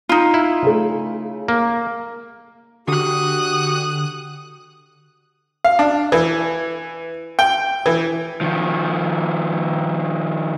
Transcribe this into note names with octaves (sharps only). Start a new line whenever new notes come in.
D#4 F4
E4
C#3 A3
A#3
D3 F#4 G4 D#6 F#6
F5
D4
E3
G5
E3
D#3 F3